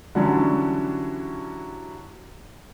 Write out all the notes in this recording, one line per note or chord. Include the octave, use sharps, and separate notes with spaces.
D3 E3 F#3 G3 C#4 D4